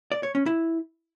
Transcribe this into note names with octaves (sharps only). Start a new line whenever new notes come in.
D5
C#5
C#4
E4